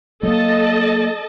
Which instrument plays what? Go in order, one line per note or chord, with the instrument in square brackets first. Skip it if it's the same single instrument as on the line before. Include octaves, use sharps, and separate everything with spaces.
[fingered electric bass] F#3 A#3 [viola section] A4 D#5 A5